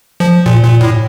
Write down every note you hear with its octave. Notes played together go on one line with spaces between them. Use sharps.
F3
A#2
A#2
A2